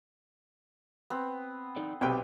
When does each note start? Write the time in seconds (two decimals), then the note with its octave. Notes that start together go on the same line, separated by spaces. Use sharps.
1.10 B3 C4
1.76 D#4 A4 D5
2.01 B1 C3 C4 B4 D5 G5